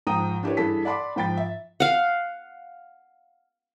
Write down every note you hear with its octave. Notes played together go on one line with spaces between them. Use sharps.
G#2 F3 G5 A#5 D#6 D#7
D4 E4 G4 A#4 B4 C#5
G2 E3 G#4 A4 B6
D5 F#5 A5 B5 C6 D6
G#2 F3 G5 B5 A6
E5
F5 F#5